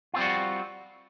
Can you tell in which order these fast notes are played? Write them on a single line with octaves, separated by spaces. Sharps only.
F4 C4 G3 F#4